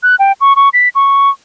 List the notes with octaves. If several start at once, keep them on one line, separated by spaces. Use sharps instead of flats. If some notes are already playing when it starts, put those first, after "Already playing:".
F#6
G5
C#6
C#6
B6
C#6